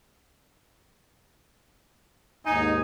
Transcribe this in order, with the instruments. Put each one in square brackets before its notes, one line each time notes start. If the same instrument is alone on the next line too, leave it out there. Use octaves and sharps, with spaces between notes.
[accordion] D#2 G#2 G#5 [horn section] D#4